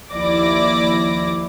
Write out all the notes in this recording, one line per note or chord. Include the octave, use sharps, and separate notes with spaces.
D#2 F3 E4 D5 D6 A#6